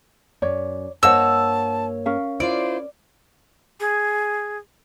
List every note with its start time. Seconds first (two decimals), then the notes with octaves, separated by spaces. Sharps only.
0.42 F#2 C#5 D5
1.03 G2 A#3 C5 C#5 D#5 F#5 A5 E6
2.06 C#4 A#4 F5
2.40 E4 F4 C5 D5
3.80 G#4